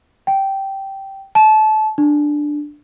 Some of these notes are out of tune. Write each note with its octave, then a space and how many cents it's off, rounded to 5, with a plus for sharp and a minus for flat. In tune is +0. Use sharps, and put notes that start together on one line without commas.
G5 -10
A5 -25
D4 +5